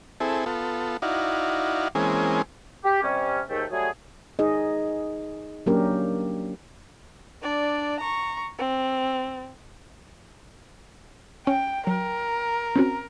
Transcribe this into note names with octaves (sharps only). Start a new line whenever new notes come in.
C4 E4 G#4 A4
B3 F4 A4
D#4 E4 F#4 D5 F5
E3 G#3 A#3 C4 C#4 G#4
G4
C3 G3 C#4
D#2 G#2 A3 G5
F#3 G3 A3 F#4 G#4
D#4 G#4 D#5
F#3 A#3 C#4 D4 G4 A#4
D4 D5
A#5 C#6
C4
C#4 G5
F#3 A#4
C4 C#4 F#4